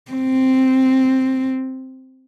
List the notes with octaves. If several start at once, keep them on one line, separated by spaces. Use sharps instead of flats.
C4